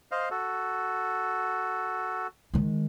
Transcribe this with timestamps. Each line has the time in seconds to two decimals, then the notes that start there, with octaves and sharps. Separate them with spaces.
0.12 C5 D#5 F5
0.31 F#4 A4
2.54 D#3 G#3